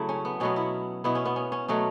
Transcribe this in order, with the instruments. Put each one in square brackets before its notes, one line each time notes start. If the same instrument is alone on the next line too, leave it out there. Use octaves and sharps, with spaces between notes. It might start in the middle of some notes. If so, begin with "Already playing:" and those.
Already playing: [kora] C#3 F#3 A3 E4
C#4
B3
B2 F#3 B3 C#4
E4
B2 B3 E4
C#4
B3
C#4
C#4
B2 F#3 A3 C#4